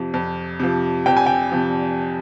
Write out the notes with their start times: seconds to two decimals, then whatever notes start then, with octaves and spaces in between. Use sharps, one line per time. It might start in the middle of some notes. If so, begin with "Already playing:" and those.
Already playing: F2 C3 F3
0.14 F2
0.60 C3 F3
1.06 F2 G5
1.17 G#5
1.26 G5
1.52 C3 F3